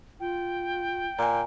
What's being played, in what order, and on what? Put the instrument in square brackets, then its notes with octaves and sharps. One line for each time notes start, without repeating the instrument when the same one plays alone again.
[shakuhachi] F4 [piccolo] G5
[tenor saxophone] A#2 [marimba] G#5 A#5